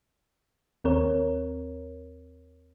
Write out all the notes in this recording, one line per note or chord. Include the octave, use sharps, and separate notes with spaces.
D#2 C4 A#4 C#5